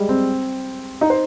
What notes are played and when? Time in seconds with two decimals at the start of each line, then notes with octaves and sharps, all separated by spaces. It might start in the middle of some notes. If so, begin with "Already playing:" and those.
Already playing: G3 G#3
0.09 C4
1.01 D#4
1.10 C5